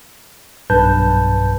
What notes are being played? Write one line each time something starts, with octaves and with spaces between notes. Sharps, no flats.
B1 G2 B4 A5 G6